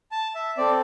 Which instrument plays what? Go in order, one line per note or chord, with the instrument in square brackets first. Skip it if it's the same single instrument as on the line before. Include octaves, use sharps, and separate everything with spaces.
[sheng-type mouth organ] A5
E5
C4 A4 D5